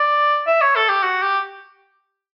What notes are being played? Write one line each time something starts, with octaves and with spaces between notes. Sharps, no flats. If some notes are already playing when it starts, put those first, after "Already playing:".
Already playing: D5
E5
C#5
A4
G4
F#4
G4